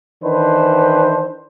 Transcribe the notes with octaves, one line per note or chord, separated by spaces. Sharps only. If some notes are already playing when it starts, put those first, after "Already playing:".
D#3 E3 D4 B4 C5